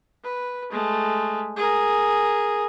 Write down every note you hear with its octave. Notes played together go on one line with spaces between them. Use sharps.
B4
G#3 A3
G#4 A#4